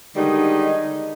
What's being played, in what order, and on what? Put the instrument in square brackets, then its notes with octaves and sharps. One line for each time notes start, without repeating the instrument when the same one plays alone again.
[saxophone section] D3 D#3 G3 G#3 D#4